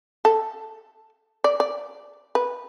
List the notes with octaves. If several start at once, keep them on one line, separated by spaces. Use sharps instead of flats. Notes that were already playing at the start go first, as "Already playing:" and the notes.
A4
D5
D5
B4